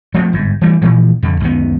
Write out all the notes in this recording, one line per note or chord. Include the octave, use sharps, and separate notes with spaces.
F3 A3 A#3 C4
G1 G#2
E3 G3 A3 A#3
A#2 E3 F3
F2 D3
C#2 F#2 D#3 B3